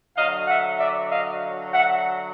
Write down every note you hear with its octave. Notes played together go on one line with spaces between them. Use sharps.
D3 F#3 D#5 F5
E5 F#5
D5 E5
D#5 F5
E5 F#5